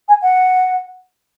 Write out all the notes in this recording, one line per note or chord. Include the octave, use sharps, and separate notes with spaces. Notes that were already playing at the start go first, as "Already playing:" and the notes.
G#5
F#5